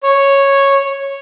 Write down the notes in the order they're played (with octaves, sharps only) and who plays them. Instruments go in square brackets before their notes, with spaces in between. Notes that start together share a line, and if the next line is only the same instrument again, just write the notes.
[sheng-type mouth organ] C#5